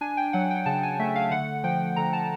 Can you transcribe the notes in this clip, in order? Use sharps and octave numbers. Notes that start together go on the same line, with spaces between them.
D4 G#5
G5
F#3 F#5
G5
C#3 A5
G#5
A3 E5
F5
D3 F#5
F3 G5
D3 A#5
A5